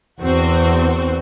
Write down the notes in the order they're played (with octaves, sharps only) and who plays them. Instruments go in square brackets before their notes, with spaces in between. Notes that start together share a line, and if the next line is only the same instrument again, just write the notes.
[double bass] E2 [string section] C4 F#4